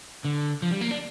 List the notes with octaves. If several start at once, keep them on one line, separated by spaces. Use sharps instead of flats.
D3
F3
G3
A#3
D4